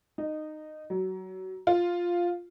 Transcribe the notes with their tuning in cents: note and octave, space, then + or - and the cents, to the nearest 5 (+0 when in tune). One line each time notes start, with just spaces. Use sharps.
D#4 -15
F#3 +25
F4 +0